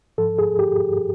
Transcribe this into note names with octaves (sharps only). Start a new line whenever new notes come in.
G#2 F3 A4
G#4
G4